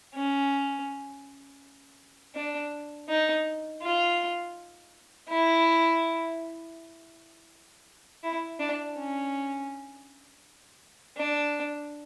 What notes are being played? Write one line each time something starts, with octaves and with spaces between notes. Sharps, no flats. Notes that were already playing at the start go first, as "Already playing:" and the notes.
C#4
D4
D#4
F4
E4
E4
D4
C#4
D4